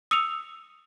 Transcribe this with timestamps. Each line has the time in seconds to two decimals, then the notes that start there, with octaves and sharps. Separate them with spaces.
0.11 D#6 E6 C#7 D#7 F7